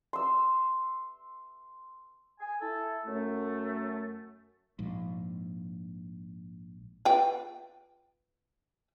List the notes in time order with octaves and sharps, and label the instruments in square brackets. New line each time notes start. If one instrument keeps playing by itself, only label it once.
[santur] C6 E6
[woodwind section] G#5
E4 A4
F#2 A3
[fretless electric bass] A#1 G#2
[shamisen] F4 B4 G5